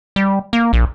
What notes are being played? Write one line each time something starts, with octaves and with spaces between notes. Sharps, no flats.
G3
A#3
A#1